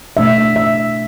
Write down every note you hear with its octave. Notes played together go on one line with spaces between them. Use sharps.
B2 A3 D4 E5
E5